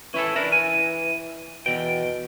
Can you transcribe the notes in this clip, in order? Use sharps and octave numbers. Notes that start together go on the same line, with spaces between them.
E3 C#4 E4 A4
E3 D4 E4 A#4
G#5
E2 B2 G5